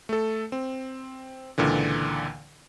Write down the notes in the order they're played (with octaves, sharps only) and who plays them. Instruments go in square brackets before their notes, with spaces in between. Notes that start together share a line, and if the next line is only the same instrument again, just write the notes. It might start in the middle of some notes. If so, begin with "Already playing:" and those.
[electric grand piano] A3 A4
C4
C#2 A#2 D3 E3